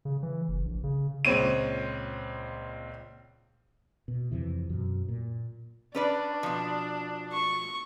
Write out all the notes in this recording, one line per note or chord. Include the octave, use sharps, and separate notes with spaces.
C#3
E3
F#1
A#1
C#3
C#2 A#2 C4 C#5 D#7
B2
F2 C3 E3
F#2 B2
A#2
C#4 D4 B4 D5
B2 F3
C#6